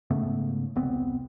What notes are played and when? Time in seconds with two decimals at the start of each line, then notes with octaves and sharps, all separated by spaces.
0.11 G#2 C#3 A3 B3
0.76 E1 C2 B3 C4